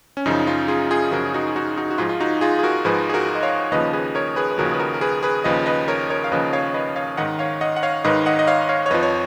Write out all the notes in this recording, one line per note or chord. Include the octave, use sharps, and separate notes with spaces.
C#4
F#2 C#3 F3 D#4
C#4 F4
F4 G#4
F4 G#4
F#2 C#3 F3 F#4 A#4
D#4 F#4
D#4 F#4
D#4 F#4
F#4
G#2 F3 F4 G#4
F4
D#4 F#4
F4 G#4
G#4
F#4 A#4
G#2 F3 G#4 B4
G#4
F#4 A#4
D#5
C#5 F5
D#2 C#3 F3 B4 D#5
G#4 B4
A#4 C#5
G#4 B4
B4
D#2 C#3 F3 F#4 A#4
B4
F#4 A#4
A#4
G#4 B4
G#4 B4
D#2 C#3 F3 B4 D#5
B4 D#5
A#4 C#5
A#4 C#5
F5
D#2 C#3 F3 B4 D#5
C#5 F5
B4 D#5
C#5 F5
G#2 D#3 D#5 F#5
C#5 F5
D#5 F#5
F#5
C#5 F5
G#2 D#3 B4 D#5
D#5 F#5
D#5
C#5 F5
C#5 F5
C#5
F2 F3 B4 D#5
C#5